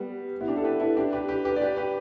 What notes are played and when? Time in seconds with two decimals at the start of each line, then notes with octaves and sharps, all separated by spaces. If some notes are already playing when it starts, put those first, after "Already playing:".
Already playing: G3 B3
0.41 B3 E4
0.48 D4 G4
0.56 E4 A4
0.64 G4 B4
0.80 E4 A4
0.97 D4 G4
1.13 G4 B4
1.28 G4 B4
1.45 G4 B4
1.56 D5
1.62 G4 B4
1.77 G4 B4